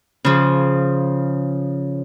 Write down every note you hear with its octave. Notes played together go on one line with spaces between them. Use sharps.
C#3 F3